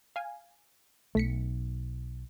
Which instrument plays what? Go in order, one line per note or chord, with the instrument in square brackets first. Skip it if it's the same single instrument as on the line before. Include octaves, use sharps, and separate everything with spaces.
[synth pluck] F5 G#5
[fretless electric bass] B1 [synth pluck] A3 B6 C#7